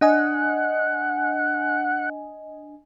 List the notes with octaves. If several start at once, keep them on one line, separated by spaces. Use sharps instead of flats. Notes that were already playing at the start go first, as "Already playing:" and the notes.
D4 D#5 F#5 G#5